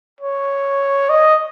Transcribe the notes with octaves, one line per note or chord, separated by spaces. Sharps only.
C#5
D#5